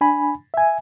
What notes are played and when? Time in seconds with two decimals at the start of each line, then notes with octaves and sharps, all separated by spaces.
0.01 D4 G#5 B5
0.54 E5 G#5